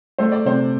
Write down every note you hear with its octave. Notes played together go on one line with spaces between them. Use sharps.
A3 C5
D5
C3 C5